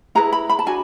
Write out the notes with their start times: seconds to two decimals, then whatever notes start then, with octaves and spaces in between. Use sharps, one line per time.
0.15 E4 G#4 B4 A#5
0.33 B5
0.49 B5
0.59 A5
0.66 D4 F#4 G#5